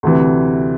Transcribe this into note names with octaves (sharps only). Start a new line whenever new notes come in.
D2 C3 E3